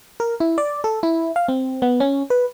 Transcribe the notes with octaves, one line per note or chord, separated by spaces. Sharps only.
A#4
E4
D5
A4
E4
F5
C4
B3
C#4
B4